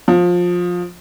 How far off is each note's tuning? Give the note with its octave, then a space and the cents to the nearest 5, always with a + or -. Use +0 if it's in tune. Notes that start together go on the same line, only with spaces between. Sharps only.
F3 +20